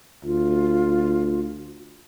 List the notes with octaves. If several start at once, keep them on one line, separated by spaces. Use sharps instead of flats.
D2 F4